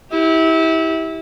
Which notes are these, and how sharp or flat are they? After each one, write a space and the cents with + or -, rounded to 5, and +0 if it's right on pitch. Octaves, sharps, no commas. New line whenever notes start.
E4 -25 G4 +0